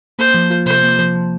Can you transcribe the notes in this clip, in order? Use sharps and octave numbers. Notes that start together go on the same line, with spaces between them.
A#3 C5
F3
F4
C3 C5
A#3
F3
F3